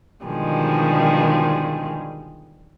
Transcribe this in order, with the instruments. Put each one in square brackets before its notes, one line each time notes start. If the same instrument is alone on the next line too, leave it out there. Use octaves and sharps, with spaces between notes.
[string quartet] B2 D3 D#3 F3 G3 G#3